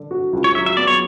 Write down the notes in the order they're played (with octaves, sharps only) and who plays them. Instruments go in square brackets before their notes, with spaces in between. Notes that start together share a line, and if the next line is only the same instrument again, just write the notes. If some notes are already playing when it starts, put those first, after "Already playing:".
Already playing: [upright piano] D3 D4
F#4
C#2
[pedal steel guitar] C#5
[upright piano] F#3 [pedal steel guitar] E5
[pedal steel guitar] E5
[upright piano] B3 [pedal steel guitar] D5
[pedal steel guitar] C#5